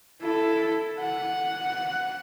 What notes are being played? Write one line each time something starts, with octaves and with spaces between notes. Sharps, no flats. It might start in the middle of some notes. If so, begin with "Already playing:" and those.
E4 A4
F#5